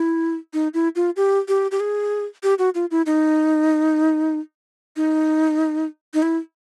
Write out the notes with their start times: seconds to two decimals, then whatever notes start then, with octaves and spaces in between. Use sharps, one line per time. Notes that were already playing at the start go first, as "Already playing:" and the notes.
Already playing: E4
0.53 D#4
0.74 E4
0.96 F4
1.16 G4
1.48 G4
1.71 G4
1.80 G#4
2.43 G4
2.59 F#4
2.75 F4
2.91 E4
3.06 D#4
4.96 D#4
6.14 D#4
6.22 E4